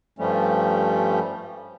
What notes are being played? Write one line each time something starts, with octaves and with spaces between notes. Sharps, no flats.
G2 F3 G3 A3 C#4